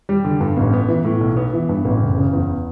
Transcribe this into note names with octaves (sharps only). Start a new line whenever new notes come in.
G3
D3
G2
A1
B3
E3
A2
B1
B3
E3
G2
A1
F#1
C#3
E2